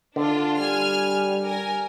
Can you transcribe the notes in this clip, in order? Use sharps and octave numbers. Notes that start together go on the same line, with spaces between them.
D3 D4 F4
G3 G#5 F6
A#4 G#5